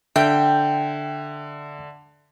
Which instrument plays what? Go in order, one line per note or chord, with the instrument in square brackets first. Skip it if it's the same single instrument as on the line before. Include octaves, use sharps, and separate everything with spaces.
[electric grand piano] D3 [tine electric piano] E5 [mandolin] G5